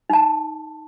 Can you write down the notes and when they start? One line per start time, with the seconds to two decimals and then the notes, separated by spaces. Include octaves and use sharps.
0.10 D#4 A5